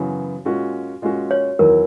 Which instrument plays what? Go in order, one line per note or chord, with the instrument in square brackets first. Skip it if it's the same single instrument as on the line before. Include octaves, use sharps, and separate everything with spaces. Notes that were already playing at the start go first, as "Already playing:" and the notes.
Already playing: [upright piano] F#2 C#3 E3 B3 F#4
A#2 G#3 C#4 F#4
A#2 G#3 C#4 F#4
[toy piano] C#5
[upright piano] E2 D#3 F#3 B3 E4 [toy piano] A#4